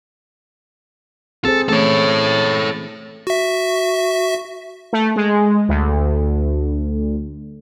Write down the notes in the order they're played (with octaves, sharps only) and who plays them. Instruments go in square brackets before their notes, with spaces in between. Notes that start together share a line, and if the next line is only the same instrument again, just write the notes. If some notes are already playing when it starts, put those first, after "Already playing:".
[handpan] C4 G#4 C5 [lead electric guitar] A4
[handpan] E3 A3 C#4 [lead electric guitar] A4 C#5
[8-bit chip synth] F#4 E5
[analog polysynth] A3
G#3
D2